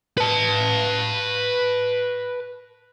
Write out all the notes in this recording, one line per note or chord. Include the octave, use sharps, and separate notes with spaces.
B4 A5